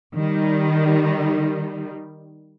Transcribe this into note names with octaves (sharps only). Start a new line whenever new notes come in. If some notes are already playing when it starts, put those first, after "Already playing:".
D#3 G3